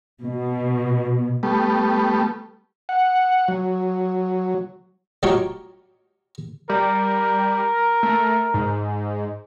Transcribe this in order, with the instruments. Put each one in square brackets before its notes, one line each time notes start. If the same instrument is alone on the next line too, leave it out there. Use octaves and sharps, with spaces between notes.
[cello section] B2
[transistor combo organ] G3 A3 B3
F#5
F#3
[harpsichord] F#3 G3 D4 D#4 F4 C#5
[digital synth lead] G3 [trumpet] A#4
[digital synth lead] A3
G#2